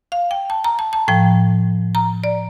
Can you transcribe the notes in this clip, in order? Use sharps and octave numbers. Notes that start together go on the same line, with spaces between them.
F5
G5
A5
A#5
A5
A5
A2 F3 G5
A#5
D5